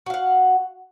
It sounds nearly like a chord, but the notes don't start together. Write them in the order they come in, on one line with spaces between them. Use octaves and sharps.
F#4 F5 F#5